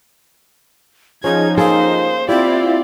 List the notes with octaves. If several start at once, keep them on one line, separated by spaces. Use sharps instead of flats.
F3 C#4 D#4 G#4 G#6
A#3 G#4 A4 C5 F5
C4 E4 F4 G4 D5 F5